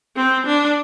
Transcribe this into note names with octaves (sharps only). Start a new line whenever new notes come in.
C4
D4